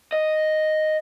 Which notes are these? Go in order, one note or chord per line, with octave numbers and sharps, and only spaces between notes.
D#5